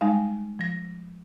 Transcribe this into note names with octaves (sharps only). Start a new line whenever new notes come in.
G3 G#3 D#4 F5
F3 A#6